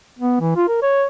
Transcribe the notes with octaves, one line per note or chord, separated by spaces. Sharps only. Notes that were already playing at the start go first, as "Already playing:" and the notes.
B3
E3
F4
A#4
C#5